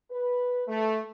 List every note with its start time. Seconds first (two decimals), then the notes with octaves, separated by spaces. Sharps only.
0.10 B4
0.67 A3